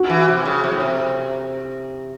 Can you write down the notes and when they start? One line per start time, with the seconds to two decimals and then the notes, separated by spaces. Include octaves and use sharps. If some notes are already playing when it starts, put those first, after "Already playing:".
Already playing: F#4
0.10 E3
0.28 C3
0.45 C#3
0.64 C3
0.72 A2
0.80 C3